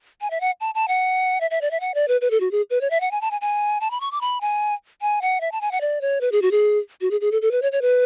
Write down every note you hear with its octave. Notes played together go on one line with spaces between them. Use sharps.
G#5
E5
F#5
A5
A5
F#5
E5
E5
D5
E5
F#5
D5
B4
B4
A4
F#4
G#4
B4
C#5
E5
F#5
G#5
A5
G#5
G#5
A5
B5
C#6
D6
B5
G#5
G#5
F#5
E5
A5
G#5
F#5
D5
C#5
B4
G#4
F#4
G#4
F#4
G#4
G#4
A4
A4
B4
C#5
C#5
B4